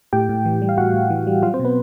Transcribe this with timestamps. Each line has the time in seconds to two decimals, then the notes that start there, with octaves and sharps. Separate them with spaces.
0.13 A2 G4 G5
0.29 A2
0.45 E3
0.62 G3
0.69 F5
0.77 A2 F#4 F#5
0.94 A2
1.10 E3
1.27 G3
1.43 F#3 F4 F5
1.54 C4 C5
1.60 B2
1.65 B3 B4